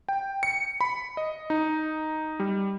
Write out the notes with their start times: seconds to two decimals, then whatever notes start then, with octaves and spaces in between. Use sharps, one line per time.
0.09 G5
0.43 C#7
0.81 B5
1.17 D#5
1.50 D#4
2.40 G3